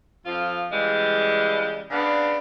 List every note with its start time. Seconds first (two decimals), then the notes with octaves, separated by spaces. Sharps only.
0.25 F2 F3 F4
0.72 C#3 E3 G3 G#3
1.90 C#3 B3 D4